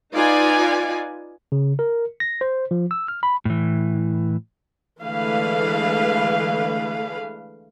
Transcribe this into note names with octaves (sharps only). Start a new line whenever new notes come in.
D#4 F4 B4 D5 G#5
C#3
A#4
A#6
C5
F3
E6
F6
B5
A2 E3
D3 E3 G#3 A3 B4 F5